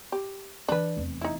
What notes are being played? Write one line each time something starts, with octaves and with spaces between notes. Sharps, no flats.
G4
E3 D4 E4 B4
F1 E2
D#4 E4